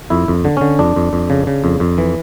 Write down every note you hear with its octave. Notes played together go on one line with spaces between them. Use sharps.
F2 E4
F2
D3
D3 C#4
F2 D4
F2
F2
C#3
C#3
F2
F2
E3